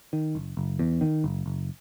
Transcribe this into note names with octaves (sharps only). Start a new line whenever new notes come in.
D#3
F#1
F#1
E2
D#3
F#1
F#1